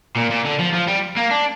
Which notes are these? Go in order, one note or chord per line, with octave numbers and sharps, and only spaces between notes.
A#2
A#2
D3
F3
F3
G3
A#3
D4